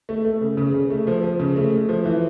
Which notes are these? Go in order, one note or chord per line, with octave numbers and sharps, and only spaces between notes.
A3
A3
C#3
C#3
C#3
A3
F3
F3
C#3
A3
A3
F3
E3